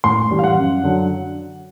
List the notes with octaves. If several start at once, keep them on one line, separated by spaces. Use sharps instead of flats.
A2 C6
E3 G3
F5
F#5
F#2
D3 F#3